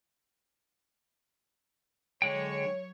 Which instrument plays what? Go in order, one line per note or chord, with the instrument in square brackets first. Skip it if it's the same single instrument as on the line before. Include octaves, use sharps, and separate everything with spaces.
[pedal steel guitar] D3 G#3 G5 [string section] F#3 C#5